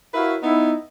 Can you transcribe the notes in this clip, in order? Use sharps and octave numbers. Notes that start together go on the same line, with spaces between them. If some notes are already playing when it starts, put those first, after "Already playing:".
E4 F#4 A#4 B4 C#5 F5
B3 D#4 E4